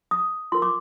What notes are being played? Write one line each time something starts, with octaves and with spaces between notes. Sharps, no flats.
D#6
F4 A#4 C6
D6